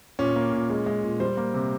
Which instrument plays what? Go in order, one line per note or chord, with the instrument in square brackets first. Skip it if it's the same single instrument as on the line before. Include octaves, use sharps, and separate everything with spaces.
[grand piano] A#2 C#4
A#3
A#2
G#3
G#3
A#2
G3 C5
A#3
C3